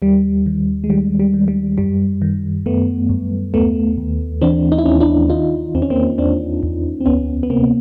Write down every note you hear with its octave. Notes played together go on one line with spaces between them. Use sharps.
D#2 G3
D#3
G#3
D#3 G3
G3
D#3
G3
F#2 G3
D#3
F#2 A3 B3
F#2
D#2 A3 B3
D#2
E3 C4 D4
D#4
E4
D#2 C#4 D#4
D4 E4
D#3 D#4 F4
E2 C4
C#4
A#3 C4
E2 C4 D4
E2
C4
D2 B3 C#4
B3
C3 A#3 C4